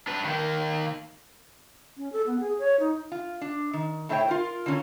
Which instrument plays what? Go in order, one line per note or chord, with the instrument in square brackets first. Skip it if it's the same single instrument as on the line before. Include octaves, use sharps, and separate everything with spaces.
[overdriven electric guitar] D4 B4
D#3 A#3
[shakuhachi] C#4
A4
B3
G#4
C#5
D#4
[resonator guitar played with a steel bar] F4
D4
D#3
A2 A3 E4 C5 C#5 G5
F4 A#4
D3 A#3 C#4